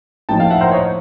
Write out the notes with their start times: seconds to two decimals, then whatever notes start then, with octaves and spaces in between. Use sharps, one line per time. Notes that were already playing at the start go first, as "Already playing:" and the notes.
0.29 A2 F3 A#3 D#4 G5 A5
0.39 F5 G5
0.50 E5 F#5
0.61 A#4 C5
0.71 C#5 D#5